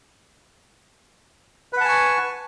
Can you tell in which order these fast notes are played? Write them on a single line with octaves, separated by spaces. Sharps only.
B4 F#5 A5 G#5 C#6